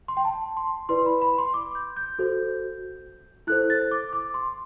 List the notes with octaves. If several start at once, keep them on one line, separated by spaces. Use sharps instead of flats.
C6
G5
A5
C6
E4 B4 D5 C6
B5
B5
C6
D6
G6
G6
F#4 A4 C5
E4 A4 C5 F#6
A6
D6
D6
C6